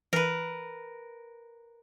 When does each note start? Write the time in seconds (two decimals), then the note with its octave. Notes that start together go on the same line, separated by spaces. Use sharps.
0.13 E3 A#4 B4